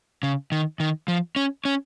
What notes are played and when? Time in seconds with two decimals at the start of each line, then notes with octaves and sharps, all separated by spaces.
0.23 C#3
0.52 D#3
0.80 D#3
1.08 F3
1.36 C#4
1.65 C#4